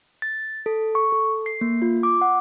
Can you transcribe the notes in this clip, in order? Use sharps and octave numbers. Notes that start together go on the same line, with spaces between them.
A6
A4
C#6
A4
C7
A#3
F4
D6
F#5